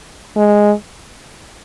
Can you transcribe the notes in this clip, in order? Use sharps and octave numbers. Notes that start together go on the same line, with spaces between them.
G#3